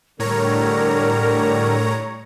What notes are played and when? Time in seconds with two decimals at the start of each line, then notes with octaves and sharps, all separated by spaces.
0.19 A2 D3 G3 A#4 C#5 A#5